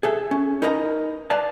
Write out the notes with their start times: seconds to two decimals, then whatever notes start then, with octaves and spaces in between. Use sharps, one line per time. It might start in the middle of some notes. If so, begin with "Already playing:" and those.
0.03 G#4 A4 E5
0.31 C#4
0.62 D#4 A#4 B4 D#5 F#5 A#5
1.30 B4 D5 F5 A5